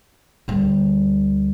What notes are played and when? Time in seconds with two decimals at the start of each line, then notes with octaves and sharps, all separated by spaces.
0.48 D2 G3